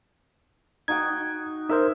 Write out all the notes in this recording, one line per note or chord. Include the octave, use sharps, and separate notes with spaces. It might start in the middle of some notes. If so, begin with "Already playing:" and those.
D#4 F#4 G5 G#6
D#4 A#4 C5 E5